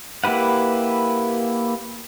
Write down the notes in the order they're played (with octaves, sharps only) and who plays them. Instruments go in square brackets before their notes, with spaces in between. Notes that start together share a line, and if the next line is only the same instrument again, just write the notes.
[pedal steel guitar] A#3 E4 G4 B4 F#5